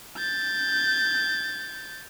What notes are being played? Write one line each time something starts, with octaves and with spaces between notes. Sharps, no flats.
G6 A6